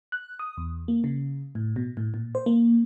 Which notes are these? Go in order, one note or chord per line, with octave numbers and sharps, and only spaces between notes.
F#6
D#6
E2
A#3
C#3
A2
B2
A2
A#2
C5
A#3